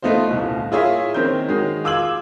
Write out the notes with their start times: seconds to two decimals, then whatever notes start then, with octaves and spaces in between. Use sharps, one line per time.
0.02 A3 B3 D#4 F4 C5
0.30 D#1 C2
0.72 E4 F4 G#4 A#4 C#5 E5
1.14 D#3 C4 C#4 A#4 G6
1.48 D#3 G#3 F#4 G#4
1.84 F4 D6 E6 G#6 F#7